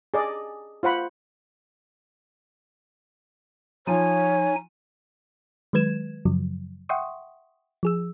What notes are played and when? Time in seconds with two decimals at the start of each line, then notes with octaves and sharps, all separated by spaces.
0.14 G#4 D5 D#5
0.83 F4 C5 F#5 B5
3.87 F3 D#4 C#5 G#5
5.73 D#3 F#3 G#3 B4 G#6 E7
6.25 F#2 C#3 F3 F#3
6.89 E5 F#5 G5 C6 C#6 D#6
7.83 F3 G#4 E6